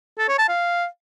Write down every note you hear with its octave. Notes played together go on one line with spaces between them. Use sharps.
A4
C#5
A5
F5